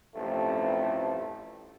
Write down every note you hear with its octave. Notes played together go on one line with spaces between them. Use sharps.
A1 G2 C3 F3 A3